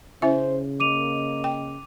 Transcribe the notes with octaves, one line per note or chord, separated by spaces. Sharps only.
C#3 C#4 E4 C5 E5
A#3 D#5 D6 D#7 F7
G5